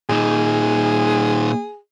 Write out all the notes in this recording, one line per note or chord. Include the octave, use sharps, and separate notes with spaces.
A#2 D#4 G#4